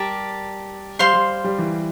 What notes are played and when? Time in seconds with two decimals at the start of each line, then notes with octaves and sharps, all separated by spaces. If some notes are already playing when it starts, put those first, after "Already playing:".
Already playing: G3 G4 A#4 D5 A5
0.99 G3 C5 F5 C6
1.13 G3
1.44 G3
1.58 E3